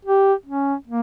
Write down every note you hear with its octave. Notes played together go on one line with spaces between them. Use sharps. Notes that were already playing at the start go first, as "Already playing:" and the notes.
G4
C#4
A#3